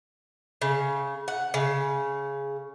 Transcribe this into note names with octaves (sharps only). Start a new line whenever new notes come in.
C#3
F#5
C#3